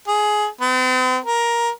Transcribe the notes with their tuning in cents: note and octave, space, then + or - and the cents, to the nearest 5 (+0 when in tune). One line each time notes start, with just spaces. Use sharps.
G#4 +15
C4 -45
A#4 +10